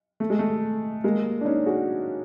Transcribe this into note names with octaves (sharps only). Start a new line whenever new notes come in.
A3
G#3
A3
G#3 A#3
D4
C#4 D#4
F#4 G#4